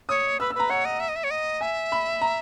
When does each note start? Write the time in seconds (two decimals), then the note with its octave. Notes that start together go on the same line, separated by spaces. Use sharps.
0.09 C#5 D#6
0.40 B4 E6
0.50 E6
0.55 B4 A#5
0.70 C#5 F#5
0.85 D#5
1.00 E5
1.09 D#5
1.16 E5
1.24 C#5
1.31 D#5
1.61 E5 G#5
1.92 B5
2.21 A#5